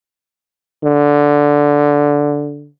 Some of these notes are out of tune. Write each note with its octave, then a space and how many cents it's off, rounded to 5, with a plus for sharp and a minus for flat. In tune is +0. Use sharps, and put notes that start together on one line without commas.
D3 -10